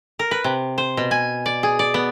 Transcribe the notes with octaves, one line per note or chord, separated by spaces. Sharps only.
A#4
B4
C3
C5
B2
G#5
D5
G#4
D5
B3